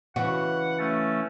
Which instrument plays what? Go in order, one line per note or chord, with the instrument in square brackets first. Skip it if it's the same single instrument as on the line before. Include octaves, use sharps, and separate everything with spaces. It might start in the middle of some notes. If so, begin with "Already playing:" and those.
[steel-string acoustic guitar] C#3 E3 [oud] F#4 [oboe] F#5
[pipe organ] A3 C#4 [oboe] A5